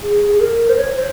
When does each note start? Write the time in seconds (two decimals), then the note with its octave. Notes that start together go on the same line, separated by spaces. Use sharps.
0.03 G#4
0.22 G#4
0.35 G#4
0.40 A#4
0.69 C5
0.77 C#5
0.96 C5